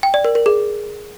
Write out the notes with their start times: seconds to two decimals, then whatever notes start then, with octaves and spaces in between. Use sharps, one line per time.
0.03 G5
0.14 D5
0.25 A#4
0.35 A#4
0.46 G#4